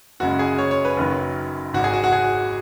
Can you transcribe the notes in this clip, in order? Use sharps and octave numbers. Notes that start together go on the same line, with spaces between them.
F#1 F#2 C#3 G#3 F#4
G#4
C#5
C#5
B4
F#1 F#2 D#3 F#3
G#1 G#2 G#3 F#4
G#4
F#4
F#4
G#4